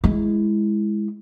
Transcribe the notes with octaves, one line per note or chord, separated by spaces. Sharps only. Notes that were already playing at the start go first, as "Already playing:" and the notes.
G#3 E4